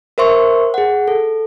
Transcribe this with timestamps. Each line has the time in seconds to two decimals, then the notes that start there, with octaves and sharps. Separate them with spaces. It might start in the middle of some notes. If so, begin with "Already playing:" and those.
0.18 A#4 C5 E5 C6 C#6
0.74 G#4 F#5
1.08 A4